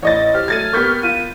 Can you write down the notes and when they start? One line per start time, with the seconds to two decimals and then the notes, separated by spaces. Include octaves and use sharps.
0.02 A1 C#5 D#5 A6
0.34 G4 C5 F6
0.48 F#3 A3 G#6 A6 D#7
0.73 A#3 B3 G4 C#6 G6 B6
1.03 F4 D#7